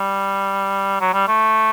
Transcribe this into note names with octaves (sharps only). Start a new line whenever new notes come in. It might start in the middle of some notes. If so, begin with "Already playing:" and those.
Already playing: G3
F#3
G3
A3